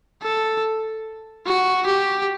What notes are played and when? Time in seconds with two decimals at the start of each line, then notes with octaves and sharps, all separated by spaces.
0.22 A4
1.46 F#4
1.87 G4